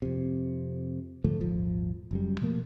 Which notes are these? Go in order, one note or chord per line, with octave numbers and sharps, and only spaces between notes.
F2 C3
G#2 D3 F3 A3
D#1 G#1 F3
F#1 F#2 G3
B2 F3 A3 A#3